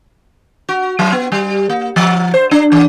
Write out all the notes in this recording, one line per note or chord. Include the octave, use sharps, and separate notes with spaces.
F#4
F#3
B3
G3
A#3
F3
C5
D4
E3